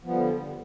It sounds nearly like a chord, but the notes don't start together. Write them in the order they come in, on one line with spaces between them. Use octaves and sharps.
F3 B3 G3 D3